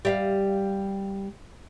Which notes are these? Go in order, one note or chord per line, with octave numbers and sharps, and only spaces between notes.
G3 E5 F5